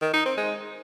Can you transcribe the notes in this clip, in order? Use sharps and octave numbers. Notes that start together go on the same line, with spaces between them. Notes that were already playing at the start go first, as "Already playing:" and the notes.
D#3
D#4
C4
G#3